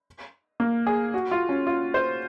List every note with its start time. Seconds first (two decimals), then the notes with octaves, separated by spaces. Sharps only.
0.60 A#3
0.87 G#4
1.14 F#4
1.31 F4
1.49 C#4
1.67 F4
1.94 C5